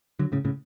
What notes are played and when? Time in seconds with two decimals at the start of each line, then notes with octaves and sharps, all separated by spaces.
0.19 D3 F#3
0.32 A2 C#3
0.45 A2 C#3